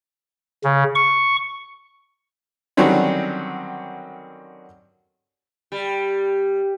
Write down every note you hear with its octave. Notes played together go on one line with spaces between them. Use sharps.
C#3
C#6
D3 D#3 F#3 G3 C4 C#4
G3